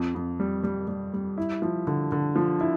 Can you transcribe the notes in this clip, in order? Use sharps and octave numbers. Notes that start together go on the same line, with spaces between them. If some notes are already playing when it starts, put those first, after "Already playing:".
Already playing: F2
F2
G3
G3
G3
G3
E4
F3
D3
D3
F3
E4